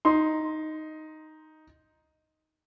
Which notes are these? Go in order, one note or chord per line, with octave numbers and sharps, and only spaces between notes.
D#4 C6